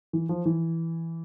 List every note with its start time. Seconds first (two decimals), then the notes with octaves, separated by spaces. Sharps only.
0.13 E3
0.29 F3
0.46 E3